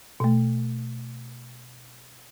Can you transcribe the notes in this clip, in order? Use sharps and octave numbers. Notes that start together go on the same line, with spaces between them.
B2 A3